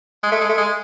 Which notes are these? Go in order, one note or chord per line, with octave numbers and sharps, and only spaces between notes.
G#3
A3
G#3
A3
G#3